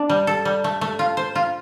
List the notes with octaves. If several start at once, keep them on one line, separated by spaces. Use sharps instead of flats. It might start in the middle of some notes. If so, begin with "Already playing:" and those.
Already playing: D4
G3
A4
G3
A3
A3
F4
C5
F4